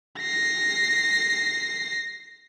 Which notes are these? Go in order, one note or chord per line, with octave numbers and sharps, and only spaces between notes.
A#6 C7